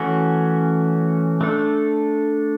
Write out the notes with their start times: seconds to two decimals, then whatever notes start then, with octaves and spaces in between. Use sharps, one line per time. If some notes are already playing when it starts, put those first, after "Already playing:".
Already playing: E3 A3 C#4 F#4
1.41 A3 D4 A4